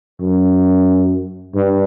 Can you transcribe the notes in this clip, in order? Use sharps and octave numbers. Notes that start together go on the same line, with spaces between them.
F#2
G2